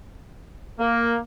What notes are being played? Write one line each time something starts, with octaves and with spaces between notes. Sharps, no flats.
A#3